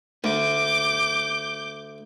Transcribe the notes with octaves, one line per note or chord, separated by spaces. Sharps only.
D2 D6 G6